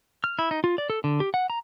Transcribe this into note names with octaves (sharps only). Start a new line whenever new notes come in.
F6
E4
D#4
F4
D5
A4
D3
G4
F#5
A#5